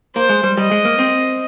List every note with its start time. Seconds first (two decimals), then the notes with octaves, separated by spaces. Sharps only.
0.16 A#3 C5
0.29 G#3
0.43 G3
0.57 G3 D#5
0.71 G#3
0.85 A#3
0.99 C4